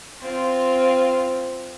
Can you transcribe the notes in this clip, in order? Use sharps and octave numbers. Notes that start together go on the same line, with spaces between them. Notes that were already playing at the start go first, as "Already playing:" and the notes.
C4 F4